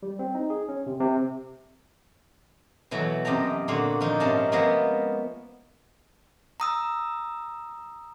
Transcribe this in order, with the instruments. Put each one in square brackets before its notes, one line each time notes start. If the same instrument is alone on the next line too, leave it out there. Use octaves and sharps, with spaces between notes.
[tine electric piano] G3
C4
D#4
G#4
C#4
C3
C3
[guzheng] B2 E3 F#3 A3
F#2 C3 D#5 G5 A5 A#5
A#2 D3 F#4 F5
F3 D4 D#4
G#2 C3 C#4 A#4 F5 A5
F3 G#3 A#3 B3 D#5 E5
[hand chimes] A#5 D#6 E6